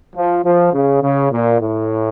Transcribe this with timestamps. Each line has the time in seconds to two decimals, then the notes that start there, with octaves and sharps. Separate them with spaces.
0.16 F3
0.44 F3
0.73 C#3
1.03 C#3
1.32 A#2
1.60 A2